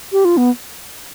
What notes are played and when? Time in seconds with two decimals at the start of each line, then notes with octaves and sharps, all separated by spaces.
0.12 G4
0.25 F4
0.37 B3